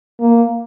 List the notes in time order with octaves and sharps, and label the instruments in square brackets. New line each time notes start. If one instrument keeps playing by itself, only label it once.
[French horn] A#3